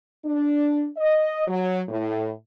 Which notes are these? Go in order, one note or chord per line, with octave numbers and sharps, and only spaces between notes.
D4
D#5
F#3
A2